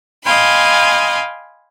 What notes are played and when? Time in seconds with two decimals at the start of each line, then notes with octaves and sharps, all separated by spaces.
0.23 D#5 F5 G5 G#5 B5 C6